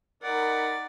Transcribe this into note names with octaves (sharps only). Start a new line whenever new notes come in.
D#4 A#4 D5 F#5 B5